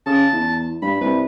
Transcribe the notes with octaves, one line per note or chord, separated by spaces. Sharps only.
C#3 A5
E2
G2 B5
C2 B4